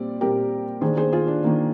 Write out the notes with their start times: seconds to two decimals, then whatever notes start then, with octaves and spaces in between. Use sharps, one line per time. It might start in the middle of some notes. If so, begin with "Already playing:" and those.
Already playing: A#2 G3 C4 D5
0.21 A#2 G3 C4 G4 A#4
0.81 D#3 A#3 D4 G#4 C5
0.97 G#4 C5
1.13 F4 G#4
1.27 D4
1.43 D#3 A#3 D4